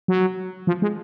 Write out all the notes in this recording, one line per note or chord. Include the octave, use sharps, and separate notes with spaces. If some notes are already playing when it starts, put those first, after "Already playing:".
F#3
F3
G#3